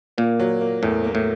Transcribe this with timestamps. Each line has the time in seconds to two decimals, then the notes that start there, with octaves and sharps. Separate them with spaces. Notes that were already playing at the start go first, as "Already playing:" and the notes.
0.18 A#2 A#3
0.40 F#3
0.61 A#3
0.82 E2 A2
1.04 A#3
1.15 A2